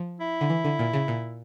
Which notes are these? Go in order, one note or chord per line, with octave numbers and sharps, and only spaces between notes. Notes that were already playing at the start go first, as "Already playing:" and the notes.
Already playing: F3
E4
D3
E3
D3
A#2
C#3
A#2